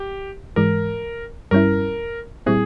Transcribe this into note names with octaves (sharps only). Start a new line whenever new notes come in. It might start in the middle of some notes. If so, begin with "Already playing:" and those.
Already playing: G4
G#2 E3 G#3 A#4
G2 G3 C#4 E4 A#4
A#2 G3 C4 E4 G#4